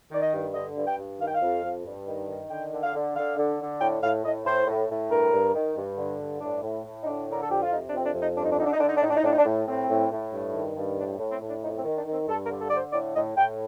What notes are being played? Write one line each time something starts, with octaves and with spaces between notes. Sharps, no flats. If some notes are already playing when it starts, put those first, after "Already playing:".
D#3 D5
D#5
G2
D3 D#5
G2
G5
G2
D#3 F5
G5
F5
F2
F2
G2
D#3
D#3
D3 G5
D3
F5
D3
D3 F5
D3
D3
A2 G5
A2 F5
A2 D#5
A2 C5
A2
A2
G2 A#4
G2
D#3
G2
D3
G2
A2 D4
A2
A2
D#4
D3 D4
D3 A#4
A4
F2 G4
F4
C3 D#4
D4
F2 C4
D4
F2
D#4
G2 D4
D#4
D4
D3 D#4
D4
D#4
D3 D4
D#4
D4
A2 D#4
D4
D#4
A2 D4
D#4
D4
A2
A2 C4
A2
A2
G2
D#3
G2
A2 D4
A2
C4
A2
D4
F2 D#4
C4
D#3
D4
D#3
C4
G2 A4
A#4
D3
A4
D3 D5
C5
A2 D5
A2 D#5
A2 G5